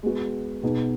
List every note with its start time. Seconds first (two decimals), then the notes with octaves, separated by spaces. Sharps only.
0.03 G#3 B3 F#4
0.62 B2 B3 D#4 G#4